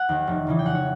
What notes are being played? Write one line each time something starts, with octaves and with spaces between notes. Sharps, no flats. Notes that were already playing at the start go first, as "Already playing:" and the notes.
Already playing: F#5
D#2 D#3
F1
E2 C#3 E3
G5
F1 F#5
C#5